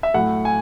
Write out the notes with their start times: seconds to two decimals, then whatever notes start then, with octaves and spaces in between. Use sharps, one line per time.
0.03 E5
0.14 A2 F#3 A3 E4 F#5
0.45 G#5